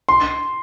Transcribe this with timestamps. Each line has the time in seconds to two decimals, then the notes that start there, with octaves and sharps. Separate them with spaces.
0.09 C6